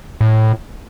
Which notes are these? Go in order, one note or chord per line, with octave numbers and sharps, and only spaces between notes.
A2